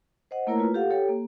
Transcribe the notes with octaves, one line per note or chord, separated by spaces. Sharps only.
C5 D#5 F#5
A3 A#3 E4 A#4 C#5 A#5
F4 B4
G4 A4 F5 F#5
G4 A4 C#5 G5
A#3